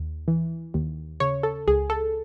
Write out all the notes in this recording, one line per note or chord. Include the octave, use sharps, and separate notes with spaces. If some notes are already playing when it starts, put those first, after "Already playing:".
Already playing: D#2
E3
D#2
C#3 C#5
A4
C#2 G#4
A4